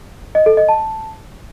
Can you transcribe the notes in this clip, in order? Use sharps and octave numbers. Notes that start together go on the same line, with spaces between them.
D#5
A4
D#5
A5